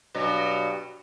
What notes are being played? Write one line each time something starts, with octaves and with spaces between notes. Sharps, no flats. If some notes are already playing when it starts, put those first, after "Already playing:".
G2 B2 F#3